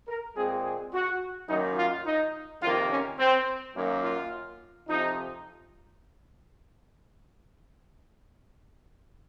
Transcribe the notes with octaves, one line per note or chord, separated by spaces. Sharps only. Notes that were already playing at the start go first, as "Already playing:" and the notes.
A#4
A#2 G#3 C4 G#4
G#4
F#4
F#2 D#3 F#3 A#3 D#4
F4
D#4
F2 C3 D#3 A#3 F4
C#4
C4
F#2 D#3 F#3 A#3
F4
F2 C3 F3 D#4